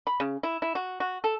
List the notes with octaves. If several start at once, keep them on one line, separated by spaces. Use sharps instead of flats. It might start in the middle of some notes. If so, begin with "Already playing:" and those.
B5
C#3
E4
E4
F#4
F#4
A4